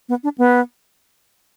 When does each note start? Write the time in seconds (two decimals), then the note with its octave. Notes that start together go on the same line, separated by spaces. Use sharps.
0.09 B3
0.24 D4
0.38 B3